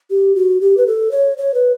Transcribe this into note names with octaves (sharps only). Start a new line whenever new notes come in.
G4
F#4
G4
B4
A4
C#5
C#5
B4